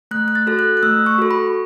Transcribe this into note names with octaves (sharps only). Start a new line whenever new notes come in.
A3 F#6
F#6
A6
F#4 A4
F#6
F#6
A3 E6
C#6
F#4 A4
B5